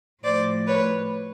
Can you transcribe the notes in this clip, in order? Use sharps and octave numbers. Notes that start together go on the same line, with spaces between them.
A2 F3 C5 D5
B4 C#5